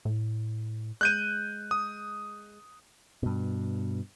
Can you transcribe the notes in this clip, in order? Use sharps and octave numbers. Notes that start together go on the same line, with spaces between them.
A2
G#3 F#6 G6 D#7
D#6
G2 B2